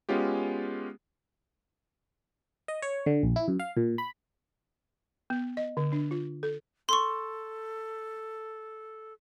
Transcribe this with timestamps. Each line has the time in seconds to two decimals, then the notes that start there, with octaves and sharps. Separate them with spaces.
0.09 G#3 B3 C#4 F4 G4
2.68 D#5
2.82 C#5
3.06 D3
3.23 A#1
3.36 E4
3.48 F#2
3.59 F5
3.77 A#2
3.98 B5
5.30 B3
5.57 D#5
5.77 D3
5.93 D4
6.11 F4
6.43 A4
6.89 A4 C6 C#6